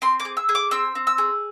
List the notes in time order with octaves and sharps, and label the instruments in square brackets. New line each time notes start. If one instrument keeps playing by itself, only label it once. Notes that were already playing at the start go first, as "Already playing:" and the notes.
[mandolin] C4 C6
D6
G#4
E6
G#4
D6
C4 E6
C4
E6
G#4